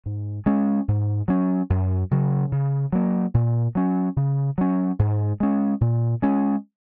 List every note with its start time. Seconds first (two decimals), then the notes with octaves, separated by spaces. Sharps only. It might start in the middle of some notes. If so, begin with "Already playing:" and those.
0.06 G#2
0.46 G#3 C#4
0.88 G#2
1.28 F#3 C#4
1.70 F#2
2.11 C#3 F#3
2.52 C#3
2.92 F#3 A#3
3.34 A#2
3.75 F#3 C#4
4.16 C#3
4.58 F#3 C#4
4.99 G#2
5.40 G#3 C#4
5.81 A#2
6.22 G#3 C#4